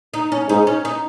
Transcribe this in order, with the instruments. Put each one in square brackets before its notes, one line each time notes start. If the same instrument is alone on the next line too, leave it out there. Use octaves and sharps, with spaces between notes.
[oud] D#4
C#4
[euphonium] G#2 [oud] D#4
[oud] C#4
D#4